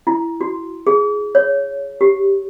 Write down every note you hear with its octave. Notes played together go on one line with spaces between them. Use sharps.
E4
F#4
G#4
C#5
G4